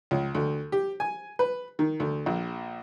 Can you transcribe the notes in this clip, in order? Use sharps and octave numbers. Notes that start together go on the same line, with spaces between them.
C#2
D2
G4
G#5
B4
D#3
D2
A#1